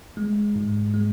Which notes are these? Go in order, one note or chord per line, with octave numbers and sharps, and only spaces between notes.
G#3
G#2
G#3